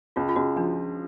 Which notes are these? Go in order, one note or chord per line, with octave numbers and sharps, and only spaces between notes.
C#2 F4
F4
C#2 F#4
F3 D4